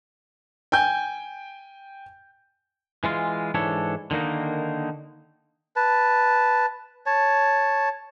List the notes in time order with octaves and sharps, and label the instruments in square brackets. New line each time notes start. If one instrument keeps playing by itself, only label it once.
[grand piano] G5 G#5 G6
[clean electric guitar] E3 G#3 F4
G#2 E3 D4 A4 C#5
D3 D#3 A#3 D#4
[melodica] B4 A5
C#5 A5